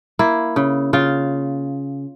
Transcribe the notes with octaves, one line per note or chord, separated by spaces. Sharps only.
A#3 E4
C#3
C#3 F4